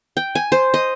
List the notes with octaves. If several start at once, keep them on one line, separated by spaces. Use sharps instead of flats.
G5
G#5
C5
D#5